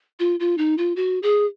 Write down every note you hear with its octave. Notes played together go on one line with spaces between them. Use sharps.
F4
F4
D#4
F4
F#4
G#4